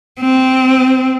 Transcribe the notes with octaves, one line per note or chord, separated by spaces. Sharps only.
C4